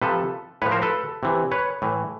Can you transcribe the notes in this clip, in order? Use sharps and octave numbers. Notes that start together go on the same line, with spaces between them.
C3 F3 A4 B4
A2 F3 B4 C#5
A#4 C5
A4 B4
C3 E3
B4 C#5
A2 E3